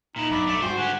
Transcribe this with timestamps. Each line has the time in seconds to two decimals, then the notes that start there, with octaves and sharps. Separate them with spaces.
0.16 A#2 D#4 E4
0.31 B1 G2 D5 E5 B5
0.47 A3 D5 E5
0.62 G#2 G3 F#4 G#4 C5 G5
0.78 D3 G4 F#5 G#5